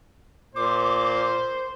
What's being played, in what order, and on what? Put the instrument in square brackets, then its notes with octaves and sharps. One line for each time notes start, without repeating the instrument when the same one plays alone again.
[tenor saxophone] A#2 [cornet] C5 [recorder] D6